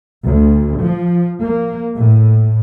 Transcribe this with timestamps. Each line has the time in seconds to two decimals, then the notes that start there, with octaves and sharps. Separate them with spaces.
0.24 D2
0.78 F3
1.42 A#3
1.99 A2